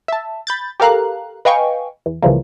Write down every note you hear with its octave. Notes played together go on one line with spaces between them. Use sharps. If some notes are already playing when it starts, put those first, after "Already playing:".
E5 A5
B5 G6 A6
G4 A4 A#4 F5 A#5 F#6
B4 D#5 F5 G5 G#5 C#6
E2
C#2 C#3 E3 F3 G3 A#3